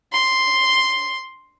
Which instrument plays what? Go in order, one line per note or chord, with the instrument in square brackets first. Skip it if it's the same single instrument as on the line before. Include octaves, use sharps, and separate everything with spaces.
[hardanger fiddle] C6